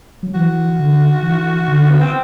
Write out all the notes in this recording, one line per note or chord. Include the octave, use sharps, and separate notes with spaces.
F#3
E3 F#4
D3
E3
D3
B3
C4